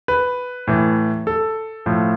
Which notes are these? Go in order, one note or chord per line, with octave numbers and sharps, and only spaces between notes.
B4
A2 E3
A4
A2 F3